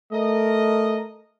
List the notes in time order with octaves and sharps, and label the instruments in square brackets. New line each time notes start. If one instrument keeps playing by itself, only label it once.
[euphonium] A3 [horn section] A#4 D#5